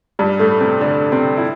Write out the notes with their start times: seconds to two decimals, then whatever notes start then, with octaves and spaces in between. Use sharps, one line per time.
0.19 G2 G3
0.39 A2 A3
0.61 C3 C4
0.81 D3 D4
1.12 C3 C4
1.37 E4